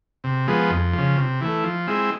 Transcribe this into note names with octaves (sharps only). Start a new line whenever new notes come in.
C3
F3 G#3 B3
F2
C#3 F3
C3
E3 A3
F3
G#3 C4 E4